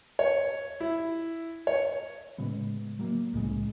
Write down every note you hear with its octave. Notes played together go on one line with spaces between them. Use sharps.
C#5
E4
C#5
A2 C#3 G#3 B3
F#3 A#3
C2 A2 C#3 G#3